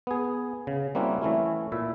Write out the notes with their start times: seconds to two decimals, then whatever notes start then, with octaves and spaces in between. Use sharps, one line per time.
0.07 B3 G#4
0.67 C#3
0.95 G3 A#3 C4 C#4 E4 F#4
1.22 E3 A3 C#4 E4
1.72 A#2 E4 E5